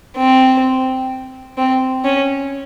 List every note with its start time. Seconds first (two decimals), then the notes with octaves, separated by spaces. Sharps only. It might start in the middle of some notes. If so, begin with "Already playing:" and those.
0.17 C4
1.58 C4
2.05 C#4